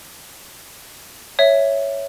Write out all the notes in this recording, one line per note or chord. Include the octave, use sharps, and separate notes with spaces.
C#5 E5